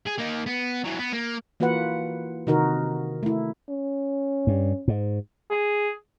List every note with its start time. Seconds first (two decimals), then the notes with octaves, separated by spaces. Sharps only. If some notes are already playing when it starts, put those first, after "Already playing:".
0.06 G#4
0.18 A#3 D#4
0.46 B3
0.84 E3 F#3
0.99 B3
1.12 A#3
1.60 E3 A#3 F4 F#4 B4 F#5
2.47 C3 D#3 D#4 F#4 A#4
3.23 A3 E4
3.69 C#4
4.47 G2
4.88 G#2
5.51 G#4